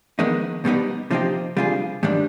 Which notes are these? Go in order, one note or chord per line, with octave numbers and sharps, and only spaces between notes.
F2 D#3 G#3 B3 D#4
B2 G3 B3 D#4
C3 F3 C4 D#4 G4
C3 G3 D4 F4 G#4
G#2 D#3 G3 D4